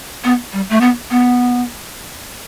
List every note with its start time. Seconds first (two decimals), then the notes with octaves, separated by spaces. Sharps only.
0.24 B3
0.53 G3
0.70 A3
0.81 B3
1.10 B3